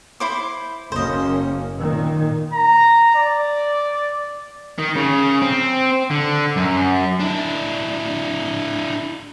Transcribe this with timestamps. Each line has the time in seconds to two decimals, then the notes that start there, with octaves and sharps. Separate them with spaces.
0.20 E4 C5 D6
0.92 F#1 A#3 C#4 C5 D#5
1.78 A#2 D#3
2.53 A#5
3.15 D5
4.78 D#3
4.96 C#3
5.42 C4
6.11 D3
6.57 F#2
7.20 D4 E4